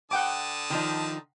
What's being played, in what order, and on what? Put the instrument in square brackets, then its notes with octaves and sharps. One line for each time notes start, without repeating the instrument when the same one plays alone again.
[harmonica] D3 A5 D#6 [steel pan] F#5 G5 D6
[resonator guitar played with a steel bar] D#3 F3 D#4